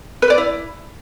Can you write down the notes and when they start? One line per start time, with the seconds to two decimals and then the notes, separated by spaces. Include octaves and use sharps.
0.22 B4
0.30 D5
0.38 E4